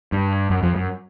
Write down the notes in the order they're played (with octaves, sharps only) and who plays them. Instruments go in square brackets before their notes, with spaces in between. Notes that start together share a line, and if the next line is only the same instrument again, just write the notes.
[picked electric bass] G2
F#2
F2
F#2